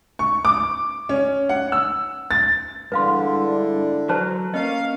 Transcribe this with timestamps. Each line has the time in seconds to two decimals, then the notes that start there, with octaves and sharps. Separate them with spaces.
0.19 C#6
0.45 D6
1.09 C#4
1.49 F#5
1.72 E6
2.31 A6
2.92 G2 D3 G#3 D4 E4 B4 F5 C6
4.09 F#3 B4 C5 A5
4.54 A#3 C#4 D#5 F5